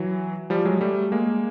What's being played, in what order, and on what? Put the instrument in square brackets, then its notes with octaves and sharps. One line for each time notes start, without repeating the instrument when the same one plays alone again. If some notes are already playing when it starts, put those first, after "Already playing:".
Already playing: [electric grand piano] E3 F#3
F3 G3
F#3 G#3
G3 A3
G#3 A#3